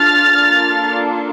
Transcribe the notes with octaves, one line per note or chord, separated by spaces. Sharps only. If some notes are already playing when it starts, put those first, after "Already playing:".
Already playing: D4 F4 A4 F6 A6
A#3 D4 F4 A4